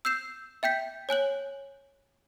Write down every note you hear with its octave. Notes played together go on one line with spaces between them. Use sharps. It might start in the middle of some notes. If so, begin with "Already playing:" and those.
E6 G6 C7 E7
E5 G5 G6 B6
C#5 G#5 F#6 F#7